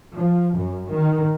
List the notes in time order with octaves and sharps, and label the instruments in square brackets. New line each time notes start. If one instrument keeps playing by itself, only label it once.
[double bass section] F3
F#2
D#3